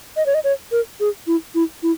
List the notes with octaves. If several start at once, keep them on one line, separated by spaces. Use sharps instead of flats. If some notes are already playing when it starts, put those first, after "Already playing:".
D#5
C#5
D#5
C#5
A#4
G#4
E4
E4
E4